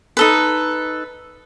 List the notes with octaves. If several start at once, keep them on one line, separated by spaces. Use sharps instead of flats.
D#4 A4 B4